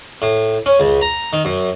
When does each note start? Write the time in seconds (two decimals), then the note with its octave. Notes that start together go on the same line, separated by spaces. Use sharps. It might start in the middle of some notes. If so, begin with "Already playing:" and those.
0.22 A2
0.66 C#4
0.80 C#2
1.01 A#5
1.33 D#3
1.45 F#2